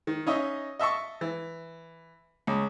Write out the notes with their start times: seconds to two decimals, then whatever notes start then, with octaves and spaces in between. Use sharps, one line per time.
0.07 D#3
0.27 C#4 D#4 D#5 E5
0.79 D#5 E5 A5 C#6
1.21 E3
2.47 C#2